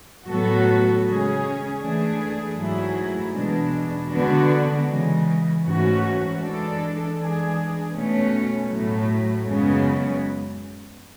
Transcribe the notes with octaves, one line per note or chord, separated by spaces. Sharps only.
A2 F#3 B3 F#4 A4
C#3 G#3 C#4 G#4
E3 A3 D4 G#4
G#2 F#3 A3 E4 G#4
E2 B2 G#3 D4
D3 G#3 B3 D4 F#4
C#3 E3 G#3
G#2 E3 A3 C#4 F#4
E3 G#3 D4 A4
E3 G#3 D4 G#4
B2 A3 C#4
A2 F#3 A3
F#2 C#3 G#3 B3